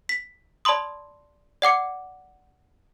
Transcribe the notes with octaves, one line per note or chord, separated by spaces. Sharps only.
B6
D5 A5 B5 C6 D#6
D5 F#5 D6 C#7